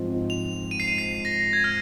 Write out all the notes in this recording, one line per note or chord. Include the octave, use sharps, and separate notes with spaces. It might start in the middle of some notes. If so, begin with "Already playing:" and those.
Already playing: G#2 F3 C4
F7
D#7
C7
D#7
C7
A#6
G#6
F6